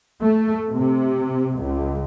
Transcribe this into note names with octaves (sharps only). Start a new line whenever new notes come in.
A3
C3
C#2